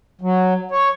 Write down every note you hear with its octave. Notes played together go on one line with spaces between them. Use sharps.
F#3
C#5